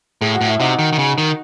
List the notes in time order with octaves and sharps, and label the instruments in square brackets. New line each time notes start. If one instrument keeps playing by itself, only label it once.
[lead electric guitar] A2 [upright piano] G#4
[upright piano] F#4
[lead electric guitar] A2
[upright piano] E4
[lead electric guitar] C3 [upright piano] D#4 F#4
[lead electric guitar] D#3
D#3
C#3
D#3